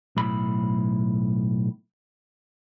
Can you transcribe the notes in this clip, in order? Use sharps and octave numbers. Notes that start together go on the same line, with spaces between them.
B1 A2 B5